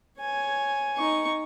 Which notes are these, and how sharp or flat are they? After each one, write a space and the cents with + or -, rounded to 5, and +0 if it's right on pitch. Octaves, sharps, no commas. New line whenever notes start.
C#5 -5 G#5 +5
D#4 +0 C#6 +0